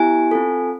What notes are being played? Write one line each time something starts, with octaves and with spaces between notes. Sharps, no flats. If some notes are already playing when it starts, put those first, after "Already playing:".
Already playing: B3 E4 G4 G#5
C4 F4 A4